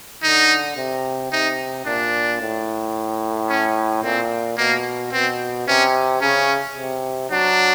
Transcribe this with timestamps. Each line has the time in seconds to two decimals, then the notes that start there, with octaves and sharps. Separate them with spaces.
0.23 D3 D#4
0.77 C3
1.31 C3 D#4
1.86 A#2 D4
2.41 A2
3.49 C#4
4.03 A#2 C4
4.58 B2 A#3
5.12 B2 C4
5.67 C3 C#4
6.22 C#3 C#4
6.76 C3
7.30 F#3 D4